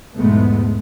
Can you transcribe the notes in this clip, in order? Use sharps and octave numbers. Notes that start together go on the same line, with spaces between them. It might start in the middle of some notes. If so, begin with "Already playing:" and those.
B1 E2 G#2 G#3 A3 B3